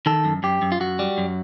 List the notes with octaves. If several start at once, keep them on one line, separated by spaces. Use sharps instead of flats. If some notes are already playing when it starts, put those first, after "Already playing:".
D#3 A4
F#2
F#2 G4
F#2
F4
F#2 F#4
G3
F#2